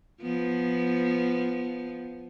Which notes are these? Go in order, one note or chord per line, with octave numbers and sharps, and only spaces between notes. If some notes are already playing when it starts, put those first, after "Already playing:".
F3 B3